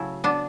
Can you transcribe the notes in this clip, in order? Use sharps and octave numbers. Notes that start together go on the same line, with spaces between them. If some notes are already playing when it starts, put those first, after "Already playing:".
Already playing: C#3 F#3 A3 E4
B3 D4